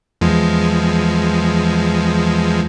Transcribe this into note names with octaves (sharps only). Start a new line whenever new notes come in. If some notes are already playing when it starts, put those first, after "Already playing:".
E2 F3 G#3